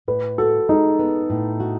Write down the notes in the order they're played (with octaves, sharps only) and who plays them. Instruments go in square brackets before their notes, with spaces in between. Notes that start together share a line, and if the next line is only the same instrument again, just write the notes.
[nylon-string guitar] A2 [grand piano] B4
[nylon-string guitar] F#4 [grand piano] A4
[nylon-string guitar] G#3 [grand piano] D#4
[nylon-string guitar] B3
A2
F#4